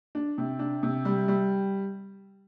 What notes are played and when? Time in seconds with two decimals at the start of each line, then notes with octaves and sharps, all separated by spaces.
0.15 D4
0.38 C3
0.59 D4
0.83 C3
1.05 G3
1.28 G3